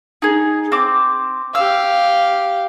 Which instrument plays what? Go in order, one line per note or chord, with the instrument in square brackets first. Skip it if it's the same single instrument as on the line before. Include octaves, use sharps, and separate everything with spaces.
[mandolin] D#4 G#4
C4 D6
[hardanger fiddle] G4 F5 [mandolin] E6